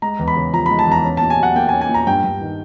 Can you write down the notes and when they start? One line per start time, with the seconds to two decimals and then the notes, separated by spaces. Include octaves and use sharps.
0.02 G#3 A#5
0.19 E2
0.28 B5
0.36 C#3
0.53 F3 A#5
0.66 B5
0.71 G#3
0.79 A5
0.87 E2 A#5
1.05 C#4
1.17 A5
1.22 A#2
1.30 G#5
1.39 F#3 F#5
1.56 A#3 G5
1.69 G#5
1.73 C#4
1.81 G#5
1.89 A#2
1.94 A#5
2.07 G2 G5
2.24 G2
2.41 D#3